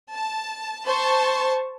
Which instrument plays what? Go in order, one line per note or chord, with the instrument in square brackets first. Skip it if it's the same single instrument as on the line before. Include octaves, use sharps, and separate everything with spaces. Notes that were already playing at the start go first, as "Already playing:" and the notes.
[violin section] A5
C5 A5 C#6